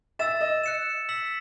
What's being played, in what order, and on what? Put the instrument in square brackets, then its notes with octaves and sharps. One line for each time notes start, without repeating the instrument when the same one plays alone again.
[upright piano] E5 [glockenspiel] E6 A6 E7
[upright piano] D#5
[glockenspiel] F#6 C#7 E7
E6 B6 F#7